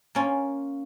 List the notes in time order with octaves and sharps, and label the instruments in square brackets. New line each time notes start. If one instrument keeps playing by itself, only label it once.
[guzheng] A#3 C#4 F4